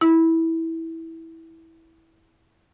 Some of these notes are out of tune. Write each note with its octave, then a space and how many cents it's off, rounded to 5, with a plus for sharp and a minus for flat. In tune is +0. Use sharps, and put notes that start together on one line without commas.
E4 -15